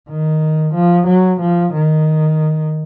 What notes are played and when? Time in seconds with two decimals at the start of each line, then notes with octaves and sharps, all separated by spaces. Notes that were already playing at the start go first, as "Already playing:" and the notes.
0.09 D#3
0.74 F3
1.07 F#3
1.40 F3
1.73 D#3